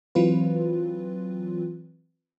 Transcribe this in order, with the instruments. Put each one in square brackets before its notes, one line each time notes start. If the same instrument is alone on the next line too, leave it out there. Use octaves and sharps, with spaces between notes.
[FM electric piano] E3 F#3 C4 F4 B4